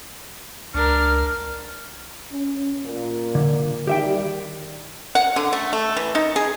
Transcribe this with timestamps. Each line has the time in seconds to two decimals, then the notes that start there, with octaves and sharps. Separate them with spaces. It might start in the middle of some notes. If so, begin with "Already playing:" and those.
0.74 C#2 D4 A#4 F6
2.32 C#4
2.84 A#2 A#3
3.35 D3
3.87 D#3 G3 G4 E5 G5
5.15 F#5
5.36 D3
5.53 A3
5.73 A3
5.97 E3
6.15 D#4
6.36 G#4